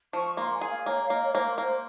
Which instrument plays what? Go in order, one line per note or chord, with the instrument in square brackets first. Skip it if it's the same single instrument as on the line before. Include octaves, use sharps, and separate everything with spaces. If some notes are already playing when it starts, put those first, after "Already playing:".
[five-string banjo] F3 [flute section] C#6
[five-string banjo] A#3 [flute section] C6
[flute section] G#5
[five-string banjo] G#4
[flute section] F5
[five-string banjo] A#3 [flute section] C#5
[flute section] F5
[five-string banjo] A#3 [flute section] D#5
[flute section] C#5
[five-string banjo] A#3 [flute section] C5
[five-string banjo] A#3 [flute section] C5